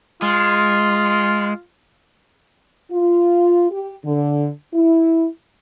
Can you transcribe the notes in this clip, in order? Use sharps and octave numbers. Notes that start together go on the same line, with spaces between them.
G#3 F4
F4
G4
D3
E4